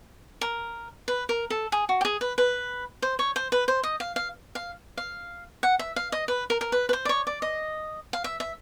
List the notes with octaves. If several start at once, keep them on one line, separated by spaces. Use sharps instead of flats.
A#4
B4
A#4
A4
G#4
F#4
G4
G#4
B4
B4
C5
C#5
C5
B4
C5
D#5
F5
F5
F5
F5
F#5
E5
F5
D#5
B4
A#4
A#4
B4
B4
C5
D5
C#5
D5
D#5
F5
E5
E5